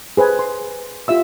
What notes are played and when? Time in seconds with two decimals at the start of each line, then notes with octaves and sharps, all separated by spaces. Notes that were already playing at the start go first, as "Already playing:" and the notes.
0.17 G#4 B4 C5 G#5
0.39 C6
1.08 F4 G4 E5 E6